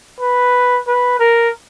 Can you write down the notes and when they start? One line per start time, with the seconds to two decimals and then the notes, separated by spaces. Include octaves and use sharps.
0.20 B4
0.87 B4
1.19 A#4